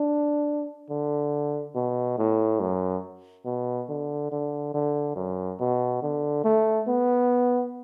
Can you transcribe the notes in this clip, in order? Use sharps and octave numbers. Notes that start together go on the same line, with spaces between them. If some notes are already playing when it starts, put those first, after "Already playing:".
Already playing: D4
D3
B2
A2
F#2
B2
D3
D3
D3
F#2
B2
D3
A3
B3